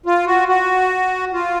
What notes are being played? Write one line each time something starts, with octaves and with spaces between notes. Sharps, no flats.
F4
F#4
F#4
F4